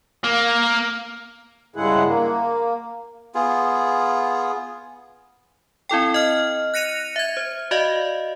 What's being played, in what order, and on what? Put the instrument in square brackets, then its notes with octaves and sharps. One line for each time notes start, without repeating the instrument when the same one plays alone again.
[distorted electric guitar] A#3
[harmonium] G2 C#3 G#3 E4 G#4 F#5
A#3
[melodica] B3 F4 G#4
[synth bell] C4 E4 A4 G5
D#5 F6
F#6 A#6 C#7 D#7 F7
E5 G#6
C5
F#4 D5 D#5 F5